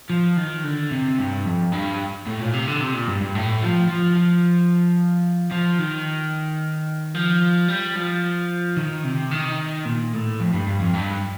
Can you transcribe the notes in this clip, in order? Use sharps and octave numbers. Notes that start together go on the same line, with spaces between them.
F3
D#3
D3
C3
G2
F2
G2
A2
A#2
C3
D3
C3
A#2
G2
G2
A2
F3
F3
F3
F3
D#3
F3
G3
F3
D#3
C3
D#3
A#2
A2
F2
G2
G2
F2
G2